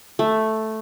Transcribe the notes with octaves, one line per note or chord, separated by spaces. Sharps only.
A3